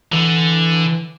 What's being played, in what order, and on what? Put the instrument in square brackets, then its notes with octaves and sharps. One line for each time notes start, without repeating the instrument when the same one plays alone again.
[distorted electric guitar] D3 [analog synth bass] E3